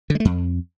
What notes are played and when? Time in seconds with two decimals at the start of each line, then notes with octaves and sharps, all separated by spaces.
0.10 D3
0.15 G#3
0.20 A3
0.25 F2